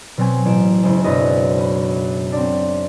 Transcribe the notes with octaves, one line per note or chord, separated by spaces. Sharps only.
B2 F#3 C4 C5 G#5 G#6
A1 D7 E7
F#1 G#3 C5 G#5 E7
B1 F#2 D4 B4 C5 D#5
B5
C4 D4